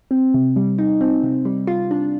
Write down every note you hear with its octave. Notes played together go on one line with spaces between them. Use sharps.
C4
C3
G3
D#4
C4
C3
G3
F4
D4